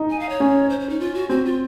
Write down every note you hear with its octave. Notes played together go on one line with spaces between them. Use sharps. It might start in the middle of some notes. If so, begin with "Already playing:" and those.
Already playing: D#4
G#5
F5
C#5
C#4
C5
C5
D#4
F4
F#4
C4 F#4
F4